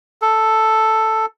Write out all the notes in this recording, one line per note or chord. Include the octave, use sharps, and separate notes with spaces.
A4